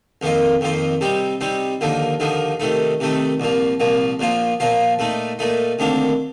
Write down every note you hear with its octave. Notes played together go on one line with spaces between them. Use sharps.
F2 D#3 A#3 F4
F2 D#3 A#3 F4
C3 G3 C4 D#4
C3 G3 C4 D#4
D#2 D3 F3 A#3 D#4
D#2 D3 F3 A#3 D#4
C3 D#3 A3 D#4
C3 D#3 A3 D#4
C2 A#2 F3 A#3
C2 A#2 F3 A#3
A#1 A#2 F3 A#3 F4
A#1 A#2 F3 A#3 F4
A#2 A3 D#4
A#2 A3 D#4
D2 C3 D#3 A#3 D4